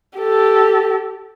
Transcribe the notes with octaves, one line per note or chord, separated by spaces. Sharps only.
G4 A4